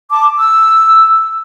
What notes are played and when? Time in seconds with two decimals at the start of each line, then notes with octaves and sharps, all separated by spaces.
0.11 A5 D6
0.38 E6